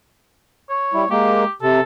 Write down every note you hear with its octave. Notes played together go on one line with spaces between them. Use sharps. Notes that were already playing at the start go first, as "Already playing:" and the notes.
C#5
G3 E4
G#3 A#3 G4
C3 A4